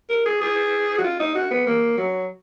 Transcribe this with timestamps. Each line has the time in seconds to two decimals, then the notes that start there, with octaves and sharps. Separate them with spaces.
0.09 A#4
0.25 G#4
0.41 G#4
0.98 F#4
1.04 F4
1.20 D#4
1.35 F#4
1.51 B3
1.66 A#3
1.97 F#3